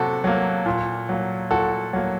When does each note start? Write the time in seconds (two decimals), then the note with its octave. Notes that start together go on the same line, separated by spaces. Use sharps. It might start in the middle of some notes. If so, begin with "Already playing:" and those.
Already playing: C3 F#3 A#3 F#4 A4
0.24 F#3 A#3
0.66 A#2
1.09 F#3 A#3
1.51 A#2 F#4 A4
1.93 F#3 A#3